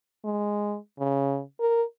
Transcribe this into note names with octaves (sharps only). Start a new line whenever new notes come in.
G#3
C#3
A#4